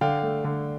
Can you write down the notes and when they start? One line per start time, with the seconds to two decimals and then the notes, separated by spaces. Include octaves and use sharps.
0.01 D3 F5 G5
0.23 A3
0.44 D3